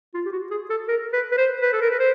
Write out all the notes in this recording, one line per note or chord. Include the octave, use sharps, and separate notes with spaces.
F4
G4
F#4
G#4
A4
A#4
B4
B4
C5
B4
A4
A#4
B4
C5